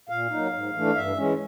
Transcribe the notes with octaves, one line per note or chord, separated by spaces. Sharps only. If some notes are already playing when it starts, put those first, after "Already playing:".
A#2 F5
F#3 A#3 D#4
G#2
E3 A3 D4
G2 E5
E3 G#3 C#4